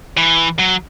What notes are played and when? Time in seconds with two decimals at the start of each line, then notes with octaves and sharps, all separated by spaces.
0.17 E3
0.59 F#3